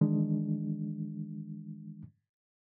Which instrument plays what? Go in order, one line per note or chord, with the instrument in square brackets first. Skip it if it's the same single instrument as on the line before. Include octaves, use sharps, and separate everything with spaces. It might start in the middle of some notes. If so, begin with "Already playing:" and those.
[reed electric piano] D#3 E3 G#3 D4